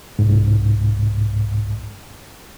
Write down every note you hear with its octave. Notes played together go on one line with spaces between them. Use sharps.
C2 G#2